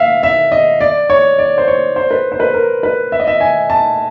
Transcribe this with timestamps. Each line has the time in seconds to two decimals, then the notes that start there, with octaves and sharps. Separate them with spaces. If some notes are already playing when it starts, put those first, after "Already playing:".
Already playing: E5 F5
0.23 E5
0.52 D#5
0.81 D5
1.10 C#5
1.39 D5
1.58 C5
1.68 C#5
1.96 C5
2.11 B4
2.32 C5
2.40 B4
2.54 A#4
2.83 B4
3.12 E5
3.20 D#5
3.27 E5
3.40 G#5
3.70 A5